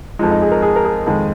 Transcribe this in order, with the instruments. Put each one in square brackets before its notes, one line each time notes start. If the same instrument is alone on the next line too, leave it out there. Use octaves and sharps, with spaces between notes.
[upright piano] F2 F3 G#3 D#4
D#4
G#4
A#4
G#4
A#4
G#4
F2 D#3 G#3